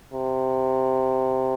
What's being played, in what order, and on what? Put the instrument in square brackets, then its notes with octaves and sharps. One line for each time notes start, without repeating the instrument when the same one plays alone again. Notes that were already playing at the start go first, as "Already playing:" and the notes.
[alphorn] C3